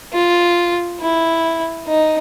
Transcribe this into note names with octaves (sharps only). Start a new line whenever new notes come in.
F4
E4
D#4